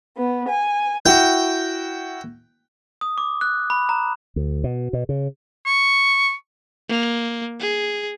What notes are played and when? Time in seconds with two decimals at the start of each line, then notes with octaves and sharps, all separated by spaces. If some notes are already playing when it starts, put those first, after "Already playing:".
0.17 B3
0.49 G#5
1.06 E4 F#4 G5
3.01 D#6
3.18 D6
3.41 F#6
3.70 B5
3.89 A#5
4.36 D2
4.64 B2
4.93 B2
5.09 C#3
5.66 C#6
6.89 A#3
7.60 G#4